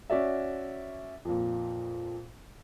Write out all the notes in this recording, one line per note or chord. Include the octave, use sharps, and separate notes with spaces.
C#4 F#4 D5 E5
F2 A#2